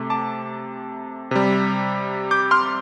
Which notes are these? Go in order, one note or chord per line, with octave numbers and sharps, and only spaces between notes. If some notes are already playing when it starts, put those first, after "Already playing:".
Already playing: C3 A3 D6
A5 D6
C3 G3
D6 G6
C6 F6